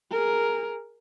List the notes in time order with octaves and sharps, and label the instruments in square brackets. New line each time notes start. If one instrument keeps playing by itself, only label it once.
[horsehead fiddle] G#4 A#4